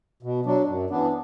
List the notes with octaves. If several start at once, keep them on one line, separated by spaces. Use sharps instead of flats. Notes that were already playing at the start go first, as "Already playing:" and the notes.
B2
F#3 D4
F#2
E3 B3 D4